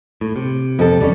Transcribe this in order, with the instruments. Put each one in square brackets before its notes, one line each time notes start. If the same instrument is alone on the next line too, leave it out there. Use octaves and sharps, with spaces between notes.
[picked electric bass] A2
C3
[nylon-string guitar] F2 A4
[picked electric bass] E2 C#4 [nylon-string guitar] G3